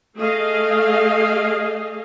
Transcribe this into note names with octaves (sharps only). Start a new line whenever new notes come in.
A3 G#4 D#5 F5